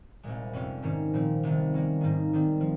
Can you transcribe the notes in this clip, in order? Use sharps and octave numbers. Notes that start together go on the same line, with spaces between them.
C2 A#2 G#3
F2 C3 G3 C#4 F4
G#2 D#3 G3 A#3 C#4
A#2 F3 C4
C2 C3 D#3
G3 A#3 C#4
G#2 D#3 A#3 D#4
D#3 G3 C4
F3